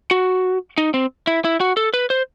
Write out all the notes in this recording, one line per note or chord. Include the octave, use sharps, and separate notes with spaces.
F#4
D#4
C4
E4
E4
F#4
A4
B4
C5